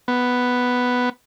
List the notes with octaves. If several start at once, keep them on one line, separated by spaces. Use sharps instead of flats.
B3